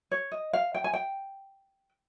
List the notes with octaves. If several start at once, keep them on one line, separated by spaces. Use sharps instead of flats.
C#5
D#5
F5
G5
G#5
G5